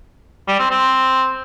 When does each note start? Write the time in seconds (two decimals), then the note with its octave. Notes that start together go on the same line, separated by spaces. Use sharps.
0.48 G3
0.59 C4
0.70 C4